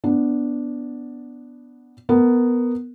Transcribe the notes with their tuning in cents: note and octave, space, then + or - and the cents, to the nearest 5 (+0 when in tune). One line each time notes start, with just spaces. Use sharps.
B3 +0 D4 -5
B3 +0 A#4 -10